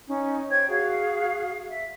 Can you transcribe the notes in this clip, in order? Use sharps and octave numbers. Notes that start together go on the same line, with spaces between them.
C#4 D#4
C5 C#5 G5 G#6
F#4 G#4 F5
E5